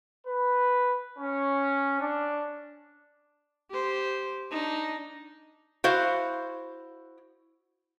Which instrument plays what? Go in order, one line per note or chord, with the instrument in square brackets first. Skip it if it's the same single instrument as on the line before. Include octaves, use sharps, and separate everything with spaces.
[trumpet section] B4
C#4
D4
[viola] G4 C5
D4 D#4
[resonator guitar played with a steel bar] E4 F#4 C5 F5